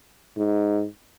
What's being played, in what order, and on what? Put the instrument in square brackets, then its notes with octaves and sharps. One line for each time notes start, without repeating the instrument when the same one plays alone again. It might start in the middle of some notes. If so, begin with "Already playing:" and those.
[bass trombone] G#2